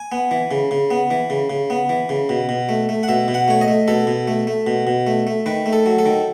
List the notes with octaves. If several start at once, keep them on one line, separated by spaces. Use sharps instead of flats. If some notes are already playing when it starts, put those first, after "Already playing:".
Already playing: G#5
B3
E3
C#3
C#3
B3
E3
C#3
C#3
B3
E3
C#3
B2
B2
A3
A3
F#5
B2 E5
B2
F#5
A3 C#5
D#5
A3
B2 A4
B2
A3
A3
B2
B2
A3
A3
D#3 B4
A3
A4
F#3
A4
D#3